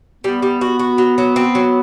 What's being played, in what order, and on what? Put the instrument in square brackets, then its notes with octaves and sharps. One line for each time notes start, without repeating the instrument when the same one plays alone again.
[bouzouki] G3 [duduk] B3
[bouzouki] G3
F#4
F#4
F#3
F#3
C4
F#3